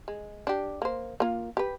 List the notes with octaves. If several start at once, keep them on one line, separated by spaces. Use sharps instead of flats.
G#3
D4 G4
A#3 C5
A#3 F4
G4 B4